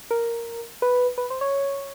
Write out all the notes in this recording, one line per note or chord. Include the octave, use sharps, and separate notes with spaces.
A#4
B4
B4
C5
C#5